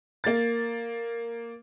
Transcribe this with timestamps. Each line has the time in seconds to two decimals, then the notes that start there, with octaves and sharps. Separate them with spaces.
0.24 A#3 A6